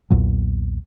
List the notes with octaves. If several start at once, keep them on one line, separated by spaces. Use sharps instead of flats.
B1 E2 A#2 F#3